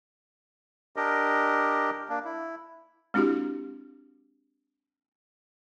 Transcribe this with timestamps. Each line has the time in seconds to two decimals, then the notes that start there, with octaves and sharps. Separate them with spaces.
0.96 D4 G4 A#4 D#5
2.09 A#3 D4
2.25 E4
3.14 G#3 C4 D4 E4 F#4 G4